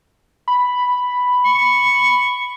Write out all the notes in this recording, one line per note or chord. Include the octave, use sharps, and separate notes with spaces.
B5
C#6